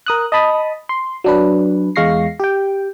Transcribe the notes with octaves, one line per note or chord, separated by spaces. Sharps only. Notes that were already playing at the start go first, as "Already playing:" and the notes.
A#4 D#6 F#6
D#5 A5 B5 D#6
C6
F#3 D4 B4
E2 G#3 F5 C#6 A#6 C7
G4 G5